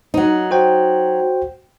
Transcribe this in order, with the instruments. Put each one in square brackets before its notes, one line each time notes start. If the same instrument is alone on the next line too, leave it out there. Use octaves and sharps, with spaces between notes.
[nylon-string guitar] F#3 D#4
[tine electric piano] F#4 C5 G5